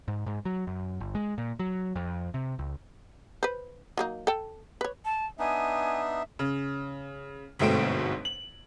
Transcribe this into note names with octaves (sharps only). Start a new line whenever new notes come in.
G#2
G#2
F#3
F#2
G1
G#3
A#2
F#3
F2
C3
C#2
B4 C5
F#3 A#3 D#4
A4 G5
B4 C#5
A5
B3 D4 D#4 E5 G#5
C#3
G1 G#2 B2 A3 C4 D7
F#7